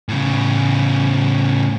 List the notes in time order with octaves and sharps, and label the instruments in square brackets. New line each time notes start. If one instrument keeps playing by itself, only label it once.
[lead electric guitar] A2 C#3